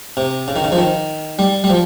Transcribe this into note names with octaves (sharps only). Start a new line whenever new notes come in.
C3
C#3
D#3
C#3
F3
D#3
G3
G3
F3